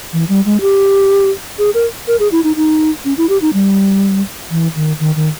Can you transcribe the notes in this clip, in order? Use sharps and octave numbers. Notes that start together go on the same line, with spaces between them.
E3
G3
G#3
G4
G#4
A#4
A#4
G#4
E4
D#4
D#4
C#4
E4
G4
D#4
G3
E3
D#3
D#3
D#3